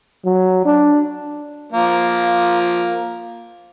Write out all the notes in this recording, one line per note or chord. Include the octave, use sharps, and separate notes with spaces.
F#3
D4
F3 A#3